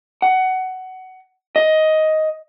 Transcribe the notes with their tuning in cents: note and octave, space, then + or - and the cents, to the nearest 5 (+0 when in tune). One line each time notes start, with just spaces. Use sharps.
F#5 +15
D#5 +10